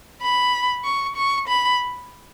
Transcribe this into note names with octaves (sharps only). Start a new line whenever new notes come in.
B5
C#6
C#6
B5